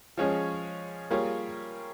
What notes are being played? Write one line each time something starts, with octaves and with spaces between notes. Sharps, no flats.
F3 G#3 C#4 G#4 C#5
G3 A#3 F4 G#4 C#5